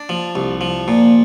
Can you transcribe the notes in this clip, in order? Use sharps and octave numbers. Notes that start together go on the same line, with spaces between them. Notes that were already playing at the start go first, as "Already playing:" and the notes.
Already playing: D4
F3
C2
F3
A#2